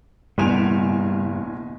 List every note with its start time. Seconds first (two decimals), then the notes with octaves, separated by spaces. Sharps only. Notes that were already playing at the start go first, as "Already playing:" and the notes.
0.38 F#1 E2 G2 B2 G3 G#5 D7 F7